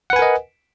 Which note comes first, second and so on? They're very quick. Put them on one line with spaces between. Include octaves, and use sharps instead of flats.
F#5 B4 G#5 A#4 D#5